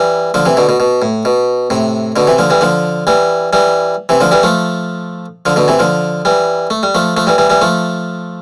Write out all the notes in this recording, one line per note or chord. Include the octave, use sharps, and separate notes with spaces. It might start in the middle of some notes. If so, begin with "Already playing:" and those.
Already playing: E3 G3
D3 F3
C3 E3
B2 D3
B2
B2
A2
B2
A2 C3
B2 D3
C3 E3
D3 F3
E3 G3
D3 F3
E3 G3
E3 G3
C3 E3
D3 F3
E3 G3
F3 A3
D3 F3
B2 D3
C3 E3
D3 F3
E3 G3
A3
G3
F3 A3
F3 A3
E3 G3
E3 G3
E3 G3
F3 A3